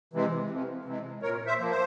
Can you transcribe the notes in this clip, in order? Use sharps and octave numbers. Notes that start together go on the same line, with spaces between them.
C3 E3 G#3
F2
C3 E3 G#3
A#2 A#4 C#5
C5 E5
F3 A#3
C5